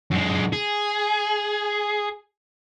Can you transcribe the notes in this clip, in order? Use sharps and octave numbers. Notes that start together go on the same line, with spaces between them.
F#2 G#3
G#4